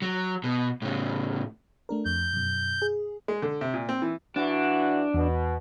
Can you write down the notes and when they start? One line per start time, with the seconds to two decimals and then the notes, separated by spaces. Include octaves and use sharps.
0.02 F#3
0.44 B2
0.82 A2 C#3
1.89 A3 D4 A#4
2.06 F2 G6
2.33 F#2 B2
2.82 G#4
3.28 G#3
3.42 D3
3.61 C3
3.74 A#2
3.89 C4
4.02 E3
4.36 E3 D4 F#4
5.14 E2 B2